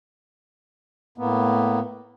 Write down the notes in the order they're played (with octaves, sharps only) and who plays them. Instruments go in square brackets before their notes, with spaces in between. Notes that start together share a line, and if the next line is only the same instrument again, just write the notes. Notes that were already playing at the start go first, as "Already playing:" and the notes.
[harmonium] A2 A#3 B3